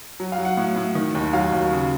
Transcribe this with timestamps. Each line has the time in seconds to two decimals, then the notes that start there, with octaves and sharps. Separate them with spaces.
0.20 F#3
0.32 F5
0.38 F#3
0.45 F#5
0.57 A2
0.76 A2
0.95 D#3
1.15 D#2
1.33 F#3 F5
1.52 D#2
1.72 C#3